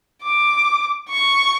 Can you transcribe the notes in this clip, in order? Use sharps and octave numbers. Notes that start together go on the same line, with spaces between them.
D6
C#6